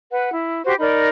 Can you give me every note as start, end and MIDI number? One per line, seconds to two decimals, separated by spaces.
0.12 0.30 71
0.12 0.30 78
0.32 0.64 64
0.65 0.74 66
0.65 0.74 67
0.65 0.74 72
0.79 1.09 63
0.79 1.09 70
0.79 1.09 74
0.79 1.09 83